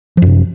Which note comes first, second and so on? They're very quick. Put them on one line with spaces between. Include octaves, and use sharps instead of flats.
F3 F#2 C3